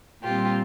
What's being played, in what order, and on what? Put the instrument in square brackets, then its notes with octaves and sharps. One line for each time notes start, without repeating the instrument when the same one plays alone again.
[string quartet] A#2 G3 C4 F4 G4